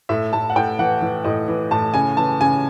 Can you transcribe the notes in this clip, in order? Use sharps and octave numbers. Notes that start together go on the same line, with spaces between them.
A2 E5
A2 A5
F#5
A2 G5
E3 F#5
E3
A2 D#5
E3
A2 A5
C#3 G#5
E3 A5
C#3 G#5